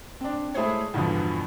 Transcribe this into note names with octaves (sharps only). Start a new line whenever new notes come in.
C4 D4
G#3 A3 E4 G#4 C5 C#5
E2 G2 B2 D3 F3